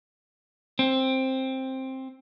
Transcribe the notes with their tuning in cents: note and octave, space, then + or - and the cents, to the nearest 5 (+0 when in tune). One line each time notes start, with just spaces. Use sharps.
C4 +10